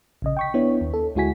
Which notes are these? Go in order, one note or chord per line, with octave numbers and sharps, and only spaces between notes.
A#1 C#3 D#5
G5 C#6 B6
B3 D4 E4 C#5
D#2
A4
D2 G#3 E4 F#4 G#5 B6